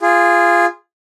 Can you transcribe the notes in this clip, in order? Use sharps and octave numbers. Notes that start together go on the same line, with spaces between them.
F4 G#4